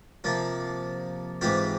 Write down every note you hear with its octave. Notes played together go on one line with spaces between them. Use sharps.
C3 F3 A#3 F4
G#2 E3 G#3 C4 F4 G4